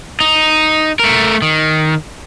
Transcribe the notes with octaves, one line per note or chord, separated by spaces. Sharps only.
D#4
A3 A#4
D#3